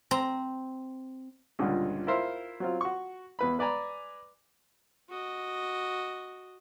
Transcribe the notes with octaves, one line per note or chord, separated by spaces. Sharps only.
C4 A#5
C#2 G2 A#2 D3
E4 F4 A#4 C5 E5 F5
F#3 C4 F4
F#4 C#6
E2 B4 B5
B4 D5 G#5 A#5 B5
F#4 D#5